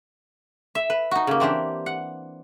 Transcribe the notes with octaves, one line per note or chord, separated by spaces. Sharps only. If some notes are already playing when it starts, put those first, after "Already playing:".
E5
B4
D#4 F#4
C#3 A#3
E3 C4 D4 G4
F#5